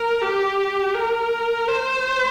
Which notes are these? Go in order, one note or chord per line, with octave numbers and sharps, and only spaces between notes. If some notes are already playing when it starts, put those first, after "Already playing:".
Already playing: A#4
G4
A#4
C5